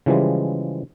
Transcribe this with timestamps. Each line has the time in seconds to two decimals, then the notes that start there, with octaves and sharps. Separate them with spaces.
0.06 C#3 E3 F3 G3 G#3